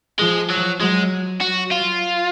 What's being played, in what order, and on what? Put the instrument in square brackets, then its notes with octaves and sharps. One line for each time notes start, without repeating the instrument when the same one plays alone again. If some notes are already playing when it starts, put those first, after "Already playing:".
[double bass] F3 [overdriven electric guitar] G#3
[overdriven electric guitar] F#3
[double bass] F#3 [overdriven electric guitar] G#3
[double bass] F#3 [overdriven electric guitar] F#4
[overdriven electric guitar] F4